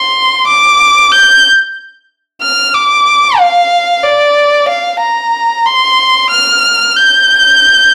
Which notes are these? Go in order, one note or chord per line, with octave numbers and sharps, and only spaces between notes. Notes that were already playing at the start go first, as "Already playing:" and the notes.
Already playing: C6
D6
G6
F6
D6
F5
D5
F5
A#5
C6
F6
G6